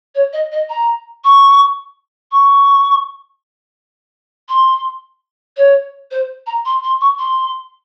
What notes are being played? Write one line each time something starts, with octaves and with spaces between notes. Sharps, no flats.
C#5
D#5
D#5
A#5
C#6
C#6
C6
C#5
C5
A#5
C6
C6
C#6
C6